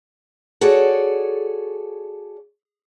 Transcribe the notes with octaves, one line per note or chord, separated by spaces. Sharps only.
F#4 G#4 A4 C#5 D5